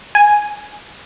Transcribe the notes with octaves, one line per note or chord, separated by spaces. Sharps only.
G#5